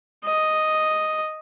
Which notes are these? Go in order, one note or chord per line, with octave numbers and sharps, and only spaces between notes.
D#5